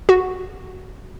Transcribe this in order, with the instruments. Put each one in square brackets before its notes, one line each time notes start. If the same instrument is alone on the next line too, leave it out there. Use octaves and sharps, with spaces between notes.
[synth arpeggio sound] F#4